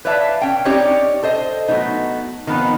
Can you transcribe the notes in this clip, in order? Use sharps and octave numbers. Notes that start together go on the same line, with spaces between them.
B4 C#5 D5 E5 F5 A5
C#4 G5
C4 C#4 D#4 G4 C#5 D5
A4 C5 D#5
F#3 A3 B3 D#4
D#3 F3 B3 C4 D#4